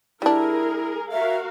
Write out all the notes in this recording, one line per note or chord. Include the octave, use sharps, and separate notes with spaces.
G3 D4 E4 G#4 A#4
F#4 A#4 E5 F5